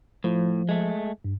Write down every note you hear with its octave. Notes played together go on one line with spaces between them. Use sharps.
A2 F3
G#3 A3
G2